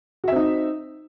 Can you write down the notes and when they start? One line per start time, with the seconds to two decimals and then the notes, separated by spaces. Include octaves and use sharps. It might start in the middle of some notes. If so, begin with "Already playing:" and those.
0.24 F#4
0.28 E5
0.32 C4
0.36 D#4